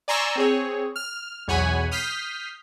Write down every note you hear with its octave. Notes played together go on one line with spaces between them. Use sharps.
D5 G#5 A#5 C6 C#6 E6
C4 G#4 C#5
F6
B1 E2 C#5 F#5 G#5 B5
D#6 F6 G6 B6 C7